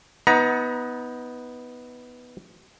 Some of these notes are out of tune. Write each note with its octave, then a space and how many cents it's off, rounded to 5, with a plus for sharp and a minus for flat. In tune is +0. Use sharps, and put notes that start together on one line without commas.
B3 +0 D#4 +30 A#5 +25